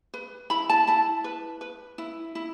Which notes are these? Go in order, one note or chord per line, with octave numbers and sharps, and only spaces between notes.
B4
E4 B5
A5
E4 A5
B4
B4
E4
E4